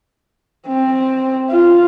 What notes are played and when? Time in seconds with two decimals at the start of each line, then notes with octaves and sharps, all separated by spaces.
0.67 C4
1.50 F4